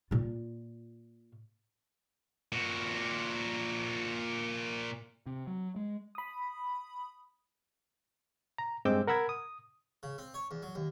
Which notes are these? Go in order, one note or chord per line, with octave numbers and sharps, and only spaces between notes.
A#2 F4
A#2 F#4
C3
F#3
G#3
B5 D#6
A#5
G2 G#3 C4 D6 E6 G6
A#4 F#5 B5 E6 G#6
D#6
C#3
C4
C#5
E2
F#3
D#2